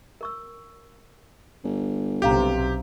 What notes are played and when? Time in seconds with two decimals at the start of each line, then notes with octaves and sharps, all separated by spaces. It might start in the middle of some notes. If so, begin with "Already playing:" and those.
0.21 A#4 C#6 E6
1.65 G1
2.22 B1 C3 C#4 G4 F5 A#5